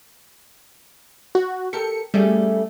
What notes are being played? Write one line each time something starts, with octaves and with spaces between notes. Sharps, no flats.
F#4
G4 A4 A#4 C#7
G3 A3 C#4 G#4